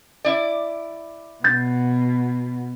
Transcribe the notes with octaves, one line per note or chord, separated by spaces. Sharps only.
E4 D5
B2 G6 A6